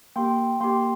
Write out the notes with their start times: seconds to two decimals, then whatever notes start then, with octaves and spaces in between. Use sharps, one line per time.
0.16 A#3 G4 G5 C6
0.60 A#3 G4 G5 C6